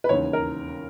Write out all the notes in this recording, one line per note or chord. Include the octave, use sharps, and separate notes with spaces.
B4
E1 D#2 C#3 C#5
A#4